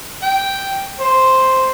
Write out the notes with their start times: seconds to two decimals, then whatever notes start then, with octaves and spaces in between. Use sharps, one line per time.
0.23 G5
1.00 C5